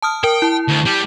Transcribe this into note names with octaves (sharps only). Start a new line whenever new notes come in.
A5 D#6 F6
A#4 G5
E4 A5
D2
G3